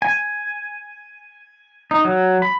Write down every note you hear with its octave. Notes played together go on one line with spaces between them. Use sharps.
G#5
D#4
F#3
B5